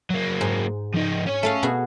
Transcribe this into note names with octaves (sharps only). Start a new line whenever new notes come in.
F#3 A#3
G#2
F3 D#4
C#4 C#5
A3 A4 F5
B2 F#4 G#4